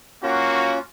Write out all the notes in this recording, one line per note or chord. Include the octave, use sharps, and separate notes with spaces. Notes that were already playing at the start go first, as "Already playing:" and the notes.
A#3 C#4 F4 F#4